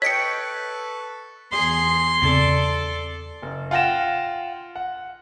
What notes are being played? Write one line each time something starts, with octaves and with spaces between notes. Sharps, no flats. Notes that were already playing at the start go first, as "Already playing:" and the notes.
A4 B4 C#5 D#5 G5 C#6 B6 C#7
E2 G#4 C6
E2 C#3 C4 A4 D5
F#1
F4 F#5 G5 A#6 E7
F#5